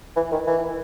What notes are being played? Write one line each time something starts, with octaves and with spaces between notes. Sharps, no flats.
E3
D#3
E3